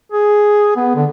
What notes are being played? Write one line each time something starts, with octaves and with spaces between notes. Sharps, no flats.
G#4
B3
D3